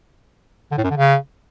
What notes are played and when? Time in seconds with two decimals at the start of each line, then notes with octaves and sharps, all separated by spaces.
0.71 D3
0.78 A2
0.84 F#2
0.90 D3
0.97 C#3